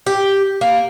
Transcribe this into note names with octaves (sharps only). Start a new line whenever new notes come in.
G4
A#3